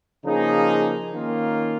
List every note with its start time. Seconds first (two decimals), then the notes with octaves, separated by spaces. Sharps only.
0.25 C#3 F3 A#3 D#4 G#4
1.13 D#3 A#3 C#4 F4